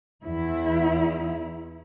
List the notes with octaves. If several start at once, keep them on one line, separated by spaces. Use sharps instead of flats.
E2 E4